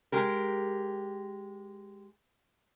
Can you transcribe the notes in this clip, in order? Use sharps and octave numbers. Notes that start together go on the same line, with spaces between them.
G#3 G4 A#4